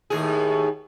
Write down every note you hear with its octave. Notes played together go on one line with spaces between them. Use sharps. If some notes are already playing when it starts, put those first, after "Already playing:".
D#2 A2 G#4